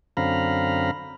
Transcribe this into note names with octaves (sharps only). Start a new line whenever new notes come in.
F#2 D3 C4 F5 A#5 B5